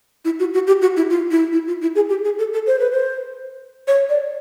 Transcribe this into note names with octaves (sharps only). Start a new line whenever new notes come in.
E4
F#4
F#4
G4
F#4
E4
F4
E4
E4
F4
E4
G#4
G4
G#4
A4
A4
C5
B4
C5
C#5
D5